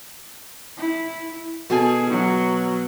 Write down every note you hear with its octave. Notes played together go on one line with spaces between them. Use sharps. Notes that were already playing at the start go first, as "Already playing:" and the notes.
E4
B2 G#4 A4 G#5
F#3